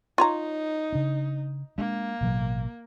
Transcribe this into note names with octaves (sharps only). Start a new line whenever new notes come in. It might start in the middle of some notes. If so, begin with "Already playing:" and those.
D#4 F4 C#5 A#5
C#3 D4
G#3 A#3 D4
A1 B2 F#3